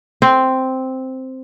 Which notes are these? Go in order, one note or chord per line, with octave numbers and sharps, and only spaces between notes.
C4